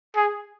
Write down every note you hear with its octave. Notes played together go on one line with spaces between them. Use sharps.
G#4